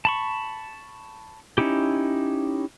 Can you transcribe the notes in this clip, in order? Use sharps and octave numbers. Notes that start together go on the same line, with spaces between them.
A5 B5 C#6
C#4 D#4 E4 G4